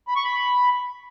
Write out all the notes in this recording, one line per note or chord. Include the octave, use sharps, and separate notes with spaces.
B5
C#6
B5